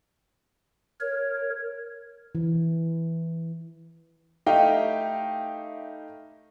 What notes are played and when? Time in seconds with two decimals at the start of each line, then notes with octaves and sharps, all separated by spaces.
1.00 A#4 C#5
2.35 E3
4.46 A3 D#4 E4 G4 F5 G5